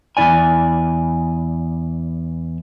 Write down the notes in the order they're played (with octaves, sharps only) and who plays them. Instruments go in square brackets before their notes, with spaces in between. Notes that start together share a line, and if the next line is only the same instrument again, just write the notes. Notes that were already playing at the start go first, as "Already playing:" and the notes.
[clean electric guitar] E2 G#2 E4 D5 G#5